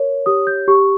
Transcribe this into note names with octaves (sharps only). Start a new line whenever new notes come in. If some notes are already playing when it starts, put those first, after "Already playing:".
Already playing: A#4 C#5
G4 D#6
G6
G4 C#6